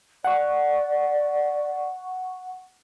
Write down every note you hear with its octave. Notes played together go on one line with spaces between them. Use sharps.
D5 F#5 C#6